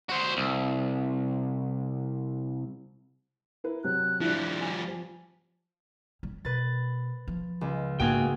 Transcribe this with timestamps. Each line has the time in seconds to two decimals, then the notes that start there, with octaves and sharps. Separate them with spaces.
0.10 F#4 C5
0.37 C2
3.64 E4 A#4 B4
3.84 C3 F#3 F#6
4.21 F3 G3 D4 E4
4.61 G#5
4.88 F3
6.23 G3
6.45 B2 B4 A6
7.28 F3
7.61 C#2
8.00 G#2 G#3 A#3 F#4 G#4 G5